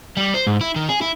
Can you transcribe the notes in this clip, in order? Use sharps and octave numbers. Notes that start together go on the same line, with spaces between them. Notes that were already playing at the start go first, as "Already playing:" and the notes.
G3
C5
G#2
E4
D#3
G#4
E4